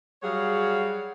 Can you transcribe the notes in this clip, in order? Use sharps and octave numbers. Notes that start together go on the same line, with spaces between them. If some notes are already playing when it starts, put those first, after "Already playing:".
F#3 G3 G#4 C#5 F5 F#5